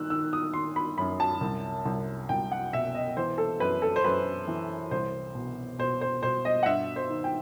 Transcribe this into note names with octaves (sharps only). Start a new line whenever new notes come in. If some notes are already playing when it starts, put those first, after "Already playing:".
Already playing: D#3 E6 F#6
D#3 E6
D#6
D#3 C6
B5
F#2 B5
A5
C2
C2
C2 G5
F#5
B2 E5
D#5
E3 C5
A4
F#2 B4
A4
C5
F#2 B4
E3
C2 C5
B2
B2 C5
C5
B2 C5
D#5
F#5
G2 E5
C5
D#3
G5